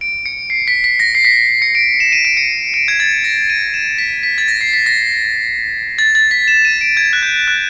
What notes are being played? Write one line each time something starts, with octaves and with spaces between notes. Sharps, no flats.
D7
C#7
C7
B6
B6
A#6
C7
B6
C#7
D7
E7
D#7
D7
C#7
D7
G#6
A6
A#6
D#7
E7
B6
B6
A6
A#6
C7
B6
A#6
A6
A6
B6
E7
D#7
D7
G#6
F#6
G6
F#6